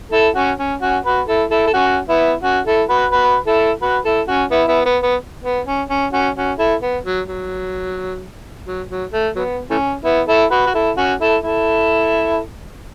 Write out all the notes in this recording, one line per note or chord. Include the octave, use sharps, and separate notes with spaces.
E4 A4
C#4 F#4
C#4
C#4 F#4
F#4 B4
E4 A4
E4 A4
A4
C#4 F#4
B3 E4
C#4 F#4
E4 A4
F#4 B4
F#4 B4
E4 A4
F#4 B4
E4 A4
C#4 F#4
B3 E4
B3 E4
B3
B3
B3
C#4
C#4
C#4 F#4
C#4 F#4
E4 A4
B3
F#3
F#3
F#3
F#3
A3
F#3 B3
E3 A3 C#4
B3 E4
E4 A4
F#4 B4
F#4
E4 A4
C#4 F#4
E4 A4
E4 A4